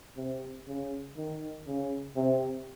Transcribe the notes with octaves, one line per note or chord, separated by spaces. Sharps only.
C3
C#3
D#3
C#3
C3